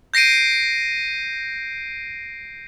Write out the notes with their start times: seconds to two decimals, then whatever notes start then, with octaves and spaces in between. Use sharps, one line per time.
0.14 G6 A#6 C7 D7 D#7